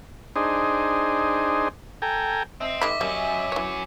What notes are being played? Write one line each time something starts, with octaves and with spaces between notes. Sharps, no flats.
D4 D#4 G#4 C5
A4 G5 G#5 A#5
C4 D#5 E5
D#3 G#3 B5 D6 B6
F#3 G3 A#3 C#4
E3 C#5